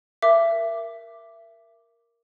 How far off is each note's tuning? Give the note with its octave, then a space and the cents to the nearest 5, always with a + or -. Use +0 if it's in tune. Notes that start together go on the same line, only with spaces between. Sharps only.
A#4 +0 E5 +25 D6 +0